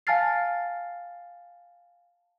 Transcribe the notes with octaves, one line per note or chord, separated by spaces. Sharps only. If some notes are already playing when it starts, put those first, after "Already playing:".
F5 G#5 A5 F6 A6 C7